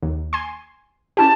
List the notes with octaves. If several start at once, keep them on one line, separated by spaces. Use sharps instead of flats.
D#2
G#5 C6
C#4 E4 G4 A5